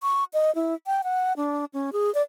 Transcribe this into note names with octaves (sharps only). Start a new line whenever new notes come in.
C#6
D#5
E4
G5
F#5
D4
C#4
G#4
D5